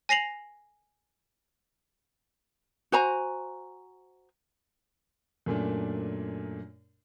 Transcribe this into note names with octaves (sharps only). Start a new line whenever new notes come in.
G#5 A#6 C7 F7 F#7
F#4 C5 G#5 A#5
F#2 A#2 A3 D4